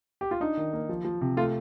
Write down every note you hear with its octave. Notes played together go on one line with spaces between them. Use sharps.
G4
F4
D4 D#4
D#3
A#3
F3
F3
C3
A3 F4